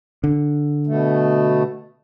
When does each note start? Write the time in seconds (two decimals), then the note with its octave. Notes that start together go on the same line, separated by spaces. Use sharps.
0.24 D3
0.87 B2 A3